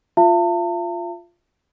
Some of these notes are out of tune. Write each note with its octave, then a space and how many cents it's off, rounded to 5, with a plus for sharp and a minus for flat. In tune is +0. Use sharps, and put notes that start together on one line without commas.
F4 +0 E5 +45 A5 +40